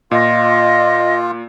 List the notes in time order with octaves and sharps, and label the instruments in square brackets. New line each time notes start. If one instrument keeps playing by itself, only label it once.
[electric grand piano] A#2 [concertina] F4 [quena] D#5